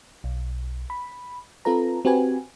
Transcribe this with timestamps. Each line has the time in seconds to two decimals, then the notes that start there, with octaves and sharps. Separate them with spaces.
0.24 B1
0.90 B5
1.65 C4 F4 A4 B4 A#5
2.05 C4 F#4 G4 B4 G#5